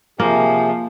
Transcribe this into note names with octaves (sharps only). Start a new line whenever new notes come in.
C3 F3 A#3 G#4